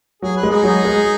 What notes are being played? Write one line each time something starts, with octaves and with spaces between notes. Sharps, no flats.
F#3 G#4
B4
G#3
D#4 G#4
F#3
G#3